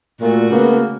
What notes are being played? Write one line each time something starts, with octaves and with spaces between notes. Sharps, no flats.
A#2 A3 F#4
C#3 A#3 B3